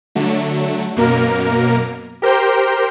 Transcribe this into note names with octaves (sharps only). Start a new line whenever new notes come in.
D3 F#3 A3
F#2 B2 A#3 A#4
G4 A#4 C5 G5